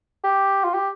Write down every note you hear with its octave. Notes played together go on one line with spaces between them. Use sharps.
G4
F4
G4